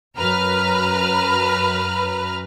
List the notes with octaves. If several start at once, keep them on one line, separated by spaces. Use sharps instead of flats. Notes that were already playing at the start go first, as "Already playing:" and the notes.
F#2 B4 A#5 F6